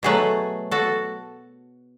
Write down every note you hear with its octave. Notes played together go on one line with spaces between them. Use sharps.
B2 F#3 A3 G#4 B4
F#4 A4